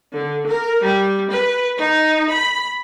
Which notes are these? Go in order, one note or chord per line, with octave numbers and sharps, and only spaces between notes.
D3
A#4
G3
B4
D#4
B5